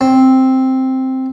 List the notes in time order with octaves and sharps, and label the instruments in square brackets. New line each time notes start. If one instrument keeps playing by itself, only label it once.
[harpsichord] C4